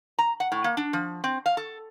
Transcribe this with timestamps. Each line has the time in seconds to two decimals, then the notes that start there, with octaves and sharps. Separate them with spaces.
0.19 A#5
0.40 F#5
0.52 A2
0.64 A#3
0.77 D4
0.93 F3
1.24 C4
1.46 F5
1.57 A4